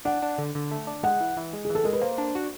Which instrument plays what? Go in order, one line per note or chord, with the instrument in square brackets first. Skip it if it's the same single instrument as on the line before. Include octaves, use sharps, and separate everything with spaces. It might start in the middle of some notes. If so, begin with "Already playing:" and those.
[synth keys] D4 [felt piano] F#5
[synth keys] D4
D3
D3
A3
D4
[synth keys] G#3 [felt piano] F#5
[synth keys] E3
E3
G#3
[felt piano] G#4
[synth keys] E3
[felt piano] A4
[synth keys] G#3 [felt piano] A#4
[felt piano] B4
[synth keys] A#3 [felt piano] C5
[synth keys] D4
F#4